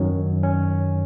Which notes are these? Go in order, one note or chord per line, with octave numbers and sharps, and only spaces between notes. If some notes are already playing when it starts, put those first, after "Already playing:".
Already playing: F#2 D#3 F#3 C#4
C#4